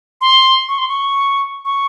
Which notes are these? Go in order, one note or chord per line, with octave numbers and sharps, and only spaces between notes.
C6
C#6
C6
C#6
C#6